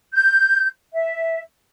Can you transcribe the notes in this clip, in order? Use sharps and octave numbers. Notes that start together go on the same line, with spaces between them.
G6
E5